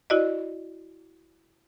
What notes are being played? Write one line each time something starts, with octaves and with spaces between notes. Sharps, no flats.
E4 F#4 D5 D#5